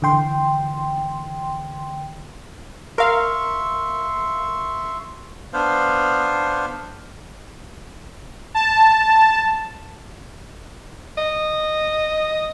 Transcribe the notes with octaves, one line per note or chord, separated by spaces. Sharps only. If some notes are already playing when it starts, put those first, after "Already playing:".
D3 E3 G5 C6
A#4 E5 F5 C6 C#6
B3 D4 C5 F5
A5
D#5